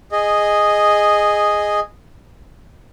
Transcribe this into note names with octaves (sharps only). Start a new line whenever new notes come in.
G#4 D#5